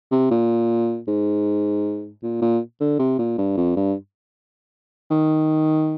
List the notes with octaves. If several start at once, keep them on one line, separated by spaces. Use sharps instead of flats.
C3
A#2
G#2
A#2
A#2
D3
C3
A#2
G2
F2
G2
D#3